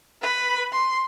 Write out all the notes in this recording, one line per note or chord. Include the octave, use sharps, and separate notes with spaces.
B4 B5
C6